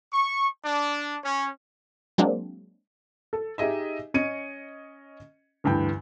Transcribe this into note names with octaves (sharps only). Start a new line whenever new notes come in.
C#6
D4
C#4
F#3 G#3 A#3 C4 D4
A4
D#4 G4 G#4 D#5 E5
C#4 D#5 G#6 C#7 D#7
D2 G2 E3 G5